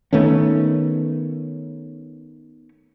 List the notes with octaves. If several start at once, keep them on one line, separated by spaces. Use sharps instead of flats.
D#3 A3 B3 C#4